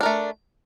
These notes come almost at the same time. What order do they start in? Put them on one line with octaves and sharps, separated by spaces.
D4 A#4 A3